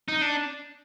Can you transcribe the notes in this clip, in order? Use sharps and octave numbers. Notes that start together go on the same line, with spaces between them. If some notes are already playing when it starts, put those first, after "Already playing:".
D#4
D4